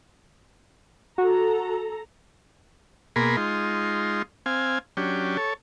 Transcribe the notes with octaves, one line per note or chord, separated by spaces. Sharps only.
F#4 A4 A#5
B2 A#3 G#4 A#4 B5 C6
G#3 D#4 F4 C6
C4 F5 G#5
F#3 C#4 D4 G4
A4 C#5